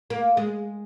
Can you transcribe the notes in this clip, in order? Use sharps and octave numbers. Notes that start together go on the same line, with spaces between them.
A#3
G#3